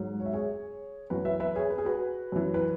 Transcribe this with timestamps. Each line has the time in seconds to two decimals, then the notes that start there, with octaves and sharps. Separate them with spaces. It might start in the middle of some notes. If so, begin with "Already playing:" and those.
Already playing: G#2 F#3
0.20 C#5
0.26 E5
0.33 G#4 C#5
1.10 F#2 E3 F#4 B4
1.25 B4 E5
1.40 B4 E5
1.55 G#4 C#5
1.70 B4
1.78 G#4
1.85 F#4 B4
2.32 F#2 E3
2.54 B4